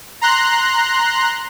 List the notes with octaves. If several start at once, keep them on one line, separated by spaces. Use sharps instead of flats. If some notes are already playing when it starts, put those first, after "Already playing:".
A#5 C6 F#6